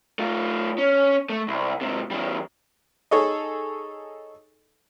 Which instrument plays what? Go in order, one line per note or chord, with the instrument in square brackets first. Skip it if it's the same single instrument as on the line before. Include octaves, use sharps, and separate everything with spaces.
[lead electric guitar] A3 F4
C#4
A3
C2
G#2 C3
E2 G3
[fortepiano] D#4 G#4 A4 C#5 D#5